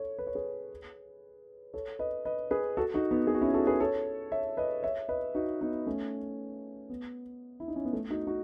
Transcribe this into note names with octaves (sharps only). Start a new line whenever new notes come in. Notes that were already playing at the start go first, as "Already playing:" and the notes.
Already playing: A4 C#5
B4
C#5
G#4 B4
A4 C#5
B4 D#5
B4 D#5
G#4 B4
F#4 A4
D#4 F#4
B3 D#4
G#4
F#4
C#4 E4
F#4 A4
G#4 B4
A4 C#5
C#5 E5
B4 D#5
C#5 E5
B4 D#5
D#4 F#4
B3 D#4
A3 C#4
B3
E4
D#4
C#4
B3
A3
D#4 F#4
D#4 F#4